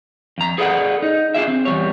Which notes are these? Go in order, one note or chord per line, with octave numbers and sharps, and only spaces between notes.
F2 A#5
G#4 A4 B4 D5 E5 F#5
D#4
D4 F4 G#4 E5
C4
E2 G3 C#5